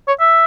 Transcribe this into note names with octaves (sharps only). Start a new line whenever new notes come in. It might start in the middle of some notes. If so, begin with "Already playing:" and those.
C#5
E5